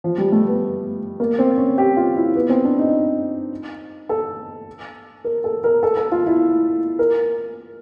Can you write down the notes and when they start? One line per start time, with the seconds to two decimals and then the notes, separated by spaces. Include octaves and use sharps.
0.04 F3
0.18 G3
0.32 A3
0.47 B3
1.20 A#3
1.39 C4
1.58 C#4
1.78 G4
1.97 F4
2.16 E4
2.36 B3
2.49 C4
2.65 D4
2.79 D#4
4.09 A4
5.24 A#4
5.44 A4
5.64 A#4
5.83 A4
5.97 A4
6.12 F4
6.27 E4
6.99 A#4